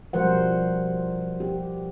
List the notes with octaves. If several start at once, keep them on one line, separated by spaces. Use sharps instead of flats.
B2 F3 G3 A#4 C5 F#5
G4